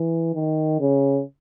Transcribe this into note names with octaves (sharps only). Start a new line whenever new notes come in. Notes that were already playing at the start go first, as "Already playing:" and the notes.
Already playing: E3
D#3
C#3